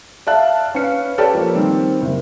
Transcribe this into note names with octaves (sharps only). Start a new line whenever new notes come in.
D5 E5 F5 A5 F#6
C#4 B4 F5 C#7
G4 A4 B4 C#5 D5 A5
F3 A#3
D#3 G3 C4
F#1